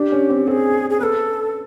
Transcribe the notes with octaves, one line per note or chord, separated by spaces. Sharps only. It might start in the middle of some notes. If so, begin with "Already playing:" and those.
Already playing: D4 G4
C#4
C4
C4 G#4 A4
G#4
B3 A4 B4